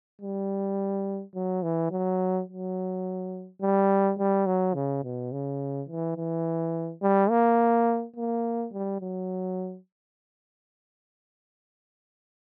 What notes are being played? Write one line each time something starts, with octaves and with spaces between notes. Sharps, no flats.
G3
F#3
E3
F#3
F#3
G3
G3
F#3
C#3
B2
C#3
E3
E3
G3
A#3
A#3
G3
F#3